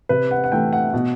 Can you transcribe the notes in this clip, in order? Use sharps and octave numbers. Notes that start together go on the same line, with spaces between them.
C3 B4
F#5
F#5
E3 A3 G5
F#5
B2